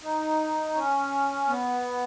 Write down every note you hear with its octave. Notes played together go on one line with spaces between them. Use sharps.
D#4
C#4
B3